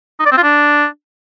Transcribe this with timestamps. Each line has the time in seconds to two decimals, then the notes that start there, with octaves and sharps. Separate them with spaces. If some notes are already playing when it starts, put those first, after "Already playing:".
0.20 D#4
0.26 D5
0.31 C4
0.37 F4
0.43 D4